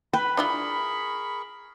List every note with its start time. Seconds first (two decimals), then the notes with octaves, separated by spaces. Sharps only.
0.13 B4 G5 B5
0.37 D4 E4 F4 G#4 A#4 B5 C#6